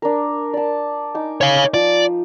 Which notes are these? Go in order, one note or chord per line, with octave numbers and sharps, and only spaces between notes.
D4 A#4
D5 A5
D#4 G#5 D6
C#5 F5
F3 D5